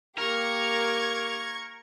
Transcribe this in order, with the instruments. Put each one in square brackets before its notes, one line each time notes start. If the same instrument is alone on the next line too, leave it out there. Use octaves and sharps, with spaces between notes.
[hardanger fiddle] A#3 G4 [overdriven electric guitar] A#4 [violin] C#6 G#6